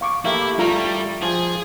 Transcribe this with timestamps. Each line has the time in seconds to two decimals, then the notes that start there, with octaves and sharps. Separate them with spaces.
0.01 F5 C#6 D6
0.25 A3 A#3 E4 G4 F5
0.59 G3 A3 F4 F5 A#5
1.23 F3 G#4